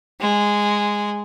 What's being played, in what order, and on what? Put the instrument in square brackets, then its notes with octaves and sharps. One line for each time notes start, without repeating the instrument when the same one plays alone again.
[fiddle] G#3